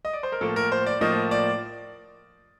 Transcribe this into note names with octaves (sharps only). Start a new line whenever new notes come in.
D#5
D5
C5
A#4
A2 F3 A#3 A4
A#4
C5
D5
A2 F3 A#3 D#5
D5